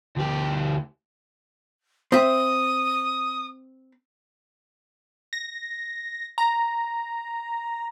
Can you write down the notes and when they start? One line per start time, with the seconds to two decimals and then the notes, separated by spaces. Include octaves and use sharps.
0.17 D2 G4
2.12 C4 E5 D#6
5.33 A#6
6.38 A#5